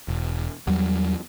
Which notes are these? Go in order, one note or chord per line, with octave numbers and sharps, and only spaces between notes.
E1
E2 F#3 G3